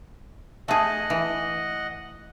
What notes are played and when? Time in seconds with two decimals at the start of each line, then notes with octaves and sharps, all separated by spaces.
0.68 A3 G#4 D#5 F#5
1.10 E3